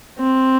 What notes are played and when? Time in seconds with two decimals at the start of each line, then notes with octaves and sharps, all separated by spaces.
0.19 C4